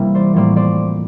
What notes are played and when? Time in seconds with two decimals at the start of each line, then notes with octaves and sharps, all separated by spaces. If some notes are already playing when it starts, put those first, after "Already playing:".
Already playing: C3 E3 G3 A#3
0.15 C5 D5
0.34 A2 F3 A#3 C5 D5
0.56 C5 D5